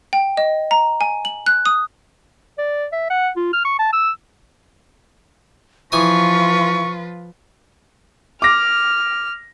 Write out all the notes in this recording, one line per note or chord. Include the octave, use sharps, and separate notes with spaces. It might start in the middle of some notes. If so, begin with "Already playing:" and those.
G5
D#5
A#5
G#5
F#7
F#6
D#6
D5
E5
F#5
F4
F6
C#6
A5
E6
E3 F3 F4 B4 G#5 C#6 D#6
D6 F6 A#6